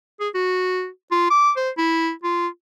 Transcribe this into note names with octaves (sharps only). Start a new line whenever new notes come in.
G#4
F#4
F4
D6
C5
E4
F4